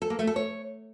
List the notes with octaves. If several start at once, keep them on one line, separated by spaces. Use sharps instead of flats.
A4
A#3
A3
A4
C#5